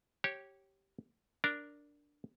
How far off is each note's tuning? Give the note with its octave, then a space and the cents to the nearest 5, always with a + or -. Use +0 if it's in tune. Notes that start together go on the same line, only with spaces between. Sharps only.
G4 -15 C#5 -15
D4 +0 A#4 -5